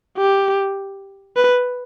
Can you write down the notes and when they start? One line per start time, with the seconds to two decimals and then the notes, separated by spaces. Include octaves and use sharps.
0.17 G4
1.36 B4